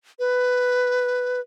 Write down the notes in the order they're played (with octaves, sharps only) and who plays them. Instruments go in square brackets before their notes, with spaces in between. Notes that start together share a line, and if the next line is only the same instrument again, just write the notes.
[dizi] B4